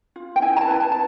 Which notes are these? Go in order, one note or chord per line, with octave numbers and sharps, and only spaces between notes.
F4
G5
E4 G#5
A#5
A5
B4
G#5
A5
A5